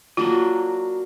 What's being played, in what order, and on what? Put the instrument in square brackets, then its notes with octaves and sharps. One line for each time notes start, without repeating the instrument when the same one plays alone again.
[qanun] F#3 A#3 D4 F#4 [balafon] F4